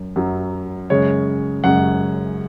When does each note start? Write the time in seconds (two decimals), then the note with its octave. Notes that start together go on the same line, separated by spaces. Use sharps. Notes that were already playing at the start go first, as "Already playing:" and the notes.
Already playing: F#2
0.16 F#2 F#3
0.90 F#2 C#3 G#3 C#5
1.64 F#2 C#3 G#3 F#5